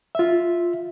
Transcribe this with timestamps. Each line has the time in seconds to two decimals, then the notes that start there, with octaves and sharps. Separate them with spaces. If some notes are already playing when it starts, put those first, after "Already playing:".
0.15 F4 E5